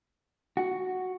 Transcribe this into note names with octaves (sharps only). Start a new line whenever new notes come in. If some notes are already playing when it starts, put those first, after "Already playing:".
F#4